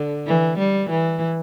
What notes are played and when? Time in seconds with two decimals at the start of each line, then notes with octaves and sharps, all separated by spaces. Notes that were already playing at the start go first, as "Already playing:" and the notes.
Already playing: D3
0.27 E3
0.59 G3
0.90 E3